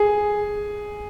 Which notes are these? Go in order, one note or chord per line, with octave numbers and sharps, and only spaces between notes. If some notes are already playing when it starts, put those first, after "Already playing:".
Already playing: G#4